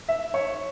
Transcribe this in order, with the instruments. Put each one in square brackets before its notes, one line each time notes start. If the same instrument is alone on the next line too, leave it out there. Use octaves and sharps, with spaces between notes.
[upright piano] E5
C#5